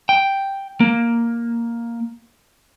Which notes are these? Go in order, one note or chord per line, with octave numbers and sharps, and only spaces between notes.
G5
A#3